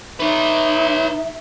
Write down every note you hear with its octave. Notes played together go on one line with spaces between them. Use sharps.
D#4 B4 C#5 E5